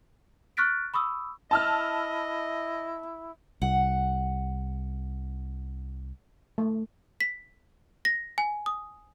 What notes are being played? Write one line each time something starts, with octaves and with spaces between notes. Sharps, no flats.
C#6 F6 F#6 A6 B6 D7
B5 C#6 D#6 E6
E4 D#5 A5 E6 F6
C2 F#5
A3
B6
A#6
G#5
D#6